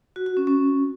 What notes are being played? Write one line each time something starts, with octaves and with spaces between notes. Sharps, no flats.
F#4
F#4
C#4
C#4